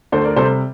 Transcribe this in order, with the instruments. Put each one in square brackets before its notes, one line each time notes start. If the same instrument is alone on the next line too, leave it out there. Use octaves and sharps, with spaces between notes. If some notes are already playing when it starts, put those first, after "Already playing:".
[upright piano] D2 A4 C5
A#4 D5
C3 G3 A4 C5